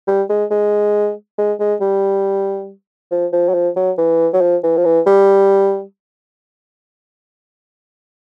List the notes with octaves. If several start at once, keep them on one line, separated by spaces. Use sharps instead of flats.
G3
G#3
G#3
G#3
G#3
G3
F3
F3
F#3
F3
F#3
E3
F#3
F3
E3
F3
E3
G3